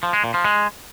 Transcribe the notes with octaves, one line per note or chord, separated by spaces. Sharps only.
F3
G#3
A#2
F3
G#3